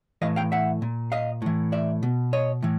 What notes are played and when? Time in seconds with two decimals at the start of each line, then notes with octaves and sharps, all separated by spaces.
0.22 A2 E3 D#5 F5
0.36 F5 G5
0.52 E5 F#5
0.82 A#2
1.12 D#5 F5
1.42 A2 E3
1.72 D5 E5
2.03 B2
2.33 C#5 D#5
2.63 A2 E3